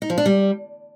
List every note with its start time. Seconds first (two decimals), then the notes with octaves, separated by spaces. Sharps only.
0.02 D#4
0.10 F3
0.18 D4
0.26 G3